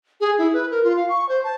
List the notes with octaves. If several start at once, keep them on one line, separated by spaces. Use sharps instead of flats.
G#4
E4
B4
A#4
F4
F5
C#6
C5
A5